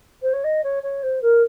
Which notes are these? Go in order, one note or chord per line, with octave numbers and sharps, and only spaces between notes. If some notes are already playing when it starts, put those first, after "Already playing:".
C5
C#5
D#5
C#5
C#5
C5
A#4